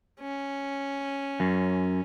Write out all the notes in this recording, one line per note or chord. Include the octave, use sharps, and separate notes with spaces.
C#4
F#2